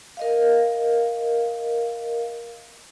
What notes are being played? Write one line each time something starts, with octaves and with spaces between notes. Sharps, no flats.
A#4 D#5 F5